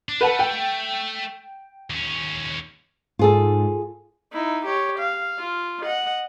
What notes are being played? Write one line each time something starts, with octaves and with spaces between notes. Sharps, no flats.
D4
A3 B4 F#5 A5
G5
D#2 C#4
G#2 F4 G#4 A4
D#4 E4
G4 C#5
F5
F4
D#5 F#5